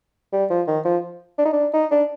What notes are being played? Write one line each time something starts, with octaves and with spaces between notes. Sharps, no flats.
G3
F3
D#3
F3
D4
D#4
D4
D#4
D4